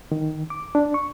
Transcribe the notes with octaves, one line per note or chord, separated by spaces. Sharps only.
D#3
D6
D4
C#6